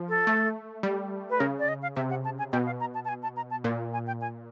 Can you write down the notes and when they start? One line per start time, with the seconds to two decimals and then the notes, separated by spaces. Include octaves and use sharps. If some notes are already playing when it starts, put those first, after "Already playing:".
Already playing: F3
0.09 A4
0.27 A3
0.83 G3
1.30 B4
1.40 C#3 A#4
1.59 D5
1.68 D#5
1.82 F5
1.96 C3 E5
2.10 F#5
2.25 A5
2.39 G#5
2.53 B2 G5
2.66 F5
2.80 A#5
2.95 A5
3.05 A5
3.09 G#5
3.23 A5
3.37 A#5
3.50 A5
3.64 A#2
3.93 G#5
4.07 G5
4.21 G#5